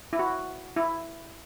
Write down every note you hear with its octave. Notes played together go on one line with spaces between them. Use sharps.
E4
F#4
E4